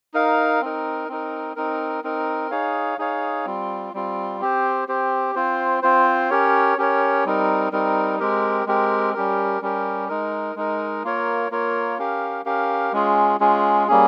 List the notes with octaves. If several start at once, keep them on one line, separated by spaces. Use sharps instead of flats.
D#4 A#4 F5
C4 D#4 A#4
C4 D#4 A#4
C4 D#4 A#4
C4 D#4 A#4
D#4 G#4 C#5 F5
D#4 G#4 C#5 F5
G3 C4 F4
G3 C4 F4
C4 G4 C5
C4 G4 C5
C4 F4 C5
C4 F4 C5
C#4 G4 A#4 C#5
C#4 G4 A#4 C#5
G3 C4 D#4 A#4
G3 C4 D#4 A#4
G#3 C4 G4 A#4
G#3 C4 G4 A#4
G3 C#4 G4 A#4
G3 C#4 G4 A#4
G#3 D#4 A#4
G#3 D#4 A#4
A#3 F4 A#4 C#5
A#3 F4 A#4 C#5
C#4 G4 A#4 F5
C#4 G4 A#4 F5
G#3 C#4 F4 G#4
G#3 C#4 F4 G#4
G3 A#3 C#4 G#4